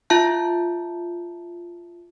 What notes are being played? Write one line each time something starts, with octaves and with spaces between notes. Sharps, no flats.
F4 E5 A5 G6